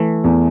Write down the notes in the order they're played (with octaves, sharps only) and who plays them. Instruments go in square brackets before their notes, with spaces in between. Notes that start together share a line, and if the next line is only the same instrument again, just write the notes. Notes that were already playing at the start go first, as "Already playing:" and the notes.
Already playing: [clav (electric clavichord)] E3 A3
[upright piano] E2